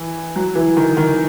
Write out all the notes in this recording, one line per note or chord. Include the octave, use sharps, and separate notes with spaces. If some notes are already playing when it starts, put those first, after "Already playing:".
Already playing: E3
F#3
E3
D#3
D#3